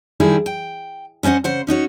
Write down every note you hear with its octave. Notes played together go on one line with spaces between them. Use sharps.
D3 D#3 G3 E4 G#4
G5
B3 C#4 C5 D#5 F#5
C#3 C5 F#5
C#4 D#4 F#4 C#5